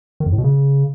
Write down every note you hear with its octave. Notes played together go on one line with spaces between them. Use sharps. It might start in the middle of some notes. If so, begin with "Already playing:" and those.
D#3
F2
A2
B2
C#3